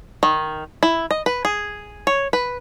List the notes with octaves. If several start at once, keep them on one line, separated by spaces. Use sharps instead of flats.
D#3
E4
D#5
B4
G#4
C#5
B4